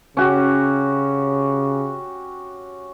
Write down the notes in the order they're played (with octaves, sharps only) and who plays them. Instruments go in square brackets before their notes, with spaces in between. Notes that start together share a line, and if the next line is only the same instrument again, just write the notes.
[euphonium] C#3 [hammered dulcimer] C#4 F#4 G4